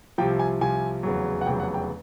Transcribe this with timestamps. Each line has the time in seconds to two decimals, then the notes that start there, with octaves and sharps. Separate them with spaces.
0.18 C2 C3 F3 G5
0.39 G#5
0.60 C2 C3 F3 G#5
1.03 F1 E2 C#3 F#3
1.41 F#5
1.46 F1 E2 C#3 F#3 G5
1.60 F#5
1.74 G5